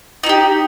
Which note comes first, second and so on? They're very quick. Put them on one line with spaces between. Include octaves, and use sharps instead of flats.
D#4 E4 G4